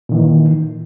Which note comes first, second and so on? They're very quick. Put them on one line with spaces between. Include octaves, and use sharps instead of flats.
A#2 D#3 E3